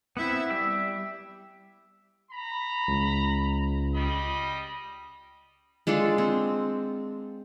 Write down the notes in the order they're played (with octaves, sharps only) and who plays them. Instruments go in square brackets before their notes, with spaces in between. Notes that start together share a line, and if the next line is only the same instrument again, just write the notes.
[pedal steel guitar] B3 C4 [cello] E4 E5
[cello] G3 [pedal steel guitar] G4 E5
[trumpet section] A#5 B5
[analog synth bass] C#2
[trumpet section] G3 D#5 B5
[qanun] G#3 D4 F4 A4
C4